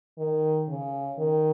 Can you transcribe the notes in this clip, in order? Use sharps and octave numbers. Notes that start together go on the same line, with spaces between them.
D#3
C#3
D#3